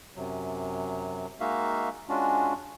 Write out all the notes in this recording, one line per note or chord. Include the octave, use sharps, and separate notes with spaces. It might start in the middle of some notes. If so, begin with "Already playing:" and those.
F#2 C3 F#3
G#3 A#3 D#4 F#4 E5 F5
G#3 C#4 D4 F4 F#4